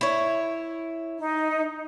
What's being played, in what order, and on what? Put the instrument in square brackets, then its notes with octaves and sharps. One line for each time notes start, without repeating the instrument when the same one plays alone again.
[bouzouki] E4 C#5
[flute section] D#4